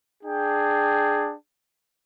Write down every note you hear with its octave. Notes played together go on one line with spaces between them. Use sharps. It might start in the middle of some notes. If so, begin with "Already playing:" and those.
D4 G#4 G5